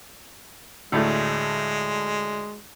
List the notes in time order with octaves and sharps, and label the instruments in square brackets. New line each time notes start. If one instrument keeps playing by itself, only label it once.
[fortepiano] D2 A2 A3 [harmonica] G#3